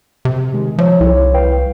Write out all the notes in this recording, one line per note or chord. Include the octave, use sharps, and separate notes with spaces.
C3
D#3 G#3
F3 C#5 E5
C2 E4 C#5
B4 F5 G5